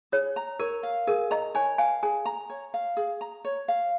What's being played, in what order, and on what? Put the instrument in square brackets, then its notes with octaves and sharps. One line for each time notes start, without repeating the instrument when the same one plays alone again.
[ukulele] G#4 [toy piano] C#5
[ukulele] A#5
[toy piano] A#4 [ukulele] C#5
[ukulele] F5
[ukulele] G#4 [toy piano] A#4
[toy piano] D#5 [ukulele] A#5
[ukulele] C#5 [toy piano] G#5
[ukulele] F5 [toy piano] G#5
[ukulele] G#4 [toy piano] G#5
[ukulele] A#5
C#5
F5
G#4
A#5
C#5
F5